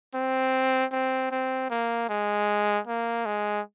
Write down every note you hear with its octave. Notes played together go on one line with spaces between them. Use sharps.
C4
C4
C4
A#3
G#3
A#3
G#3